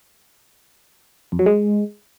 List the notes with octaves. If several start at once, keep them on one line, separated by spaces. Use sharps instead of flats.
F2
F#3
G#3